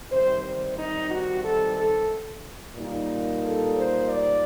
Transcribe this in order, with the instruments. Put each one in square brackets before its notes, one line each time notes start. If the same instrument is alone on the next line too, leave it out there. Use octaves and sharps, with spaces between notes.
[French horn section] C3 D#3 G3 C5
C5
D#4
F#4
A4
A4
A#2 G3 A#3 D#4
A4
C5
D5